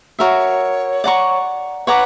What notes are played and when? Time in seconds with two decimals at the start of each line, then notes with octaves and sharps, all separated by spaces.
0.19 F#4 A#4 C#5 E5
1.04 D5 F#5 A#5 C#6
1.87 B4 C#5 F#5 A#5 D6